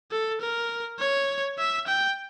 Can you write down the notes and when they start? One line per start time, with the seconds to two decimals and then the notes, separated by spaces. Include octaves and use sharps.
0.11 A4
0.41 A#4
0.99 C#5
1.58 E5
1.87 G5